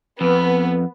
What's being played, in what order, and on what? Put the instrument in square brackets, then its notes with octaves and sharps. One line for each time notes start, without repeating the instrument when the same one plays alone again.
[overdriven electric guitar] F2 [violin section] B3